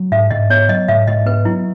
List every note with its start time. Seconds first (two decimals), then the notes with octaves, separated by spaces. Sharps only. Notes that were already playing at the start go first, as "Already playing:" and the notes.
Already playing: F#3
0.12 G#2 E5
0.31 G#2 D#5
0.50 B3 C#5
0.69 F#3 D#5
0.88 G#2 E5
1.07 G#2 D#5
1.25 B3 B4
1.45 F#3 E4